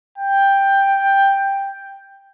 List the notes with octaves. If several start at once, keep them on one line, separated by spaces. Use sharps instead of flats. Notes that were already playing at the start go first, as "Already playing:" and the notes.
G5